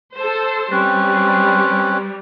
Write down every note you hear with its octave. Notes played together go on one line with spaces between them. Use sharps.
A4 C5
G3 C4 C#4 B4